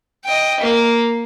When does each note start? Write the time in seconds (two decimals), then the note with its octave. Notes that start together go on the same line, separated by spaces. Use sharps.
0.25 D#5 G5
0.60 A#3